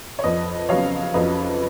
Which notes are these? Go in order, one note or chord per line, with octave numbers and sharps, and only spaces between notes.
C#5
F2 B4 D#5
C#3 F#3 B3 C#5 F5
F2 B4 D#5